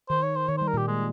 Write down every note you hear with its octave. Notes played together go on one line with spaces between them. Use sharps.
D#3 C5
C#5
C5
D#3 C#5
G3 C5
A#4
A#2 A#3 G4
G#3